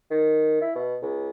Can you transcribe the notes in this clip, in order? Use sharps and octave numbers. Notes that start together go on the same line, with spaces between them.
D#3
E4
B2
C#2